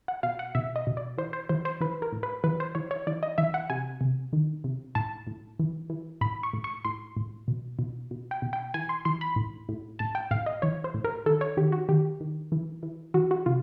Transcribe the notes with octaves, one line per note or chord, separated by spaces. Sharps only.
F#5
B2 F5
F#5
B2 E5
D#5
B2
D5
E3 C5
C5
E3 C5
C5
E3 B4
A#4
A2
B4
E3 B4
C5
E3 C#5
C#5
E3 D5
D#5
E3 E5
F#5
C3 G#5
C3
D#3
C3
A2 A5
A2
E3
E3
A2 B5
C#6
A2
C#6
A2 C6
A2
B2
B2
B2
G5
B2
G5
E3 G#5
C6
E3 C6
B5
A2
A2
A2 A5
G5
A2 F5
D#5
E3 C#5
C5
A2
A#4
D#3 A4
C#5
D#3 G4
F#4
D#3 G4
D#3
E3
E3
E3 F#4
F#4
C3 F4